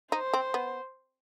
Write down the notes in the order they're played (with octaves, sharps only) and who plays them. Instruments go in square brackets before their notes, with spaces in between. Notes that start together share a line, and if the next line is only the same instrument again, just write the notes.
[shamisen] D#4 [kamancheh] C5
[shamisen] C4
B3